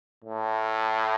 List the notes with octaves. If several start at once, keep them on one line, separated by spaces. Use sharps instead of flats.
A2